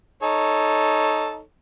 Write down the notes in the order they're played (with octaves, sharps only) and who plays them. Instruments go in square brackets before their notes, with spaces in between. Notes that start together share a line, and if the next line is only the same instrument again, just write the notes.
[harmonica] D#4 A4 C#5